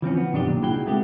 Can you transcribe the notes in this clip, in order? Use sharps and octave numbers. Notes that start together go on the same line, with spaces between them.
E3 F3 C4 C#4
B3
B1 F#2 D#3 D4 F#4 G4
B1 A#2
C#2 E4 F#4 G#4 G5
G#3 A3 B3 C4 G4